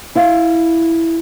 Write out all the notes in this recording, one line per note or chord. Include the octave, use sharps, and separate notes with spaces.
E4 E5 F5